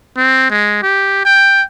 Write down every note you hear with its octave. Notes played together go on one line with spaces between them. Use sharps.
C4
G#3
G4
G5